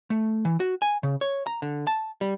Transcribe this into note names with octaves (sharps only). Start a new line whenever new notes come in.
A3
E3
F#4
G#5
C#3
C#5
A#5
D3
A5
G3